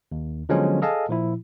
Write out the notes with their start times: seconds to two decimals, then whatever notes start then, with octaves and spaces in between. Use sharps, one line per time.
0.12 D#2
0.49 D3 F3 F#3 G#3 B3 C#4
0.82 G#4 A4 D#5 F5 G#5 A5
1.09 A#2 F3 E4